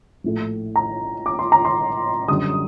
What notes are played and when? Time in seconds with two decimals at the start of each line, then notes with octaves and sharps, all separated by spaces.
0.24 A#1 A2 A3
0.76 A#5
1.26 D6
1.39 C6
1.52 A#5
1.65 C6
2.28 F#2 D3 G3 D#6